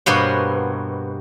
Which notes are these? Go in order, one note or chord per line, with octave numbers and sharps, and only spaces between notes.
G2 B2 A#3 B3 C5 C#5